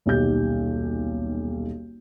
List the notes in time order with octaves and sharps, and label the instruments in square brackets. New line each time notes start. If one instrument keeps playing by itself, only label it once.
[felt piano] D#1 B1 D#4 G4 G6